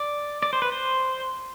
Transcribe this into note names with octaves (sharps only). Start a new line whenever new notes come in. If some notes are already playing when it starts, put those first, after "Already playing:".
Already playing: D5
D5
C5
B4
C5